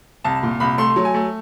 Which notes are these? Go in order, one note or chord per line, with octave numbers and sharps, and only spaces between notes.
C2 A5
A#2
C2 B5
A3 C6
F#3
G#5
A3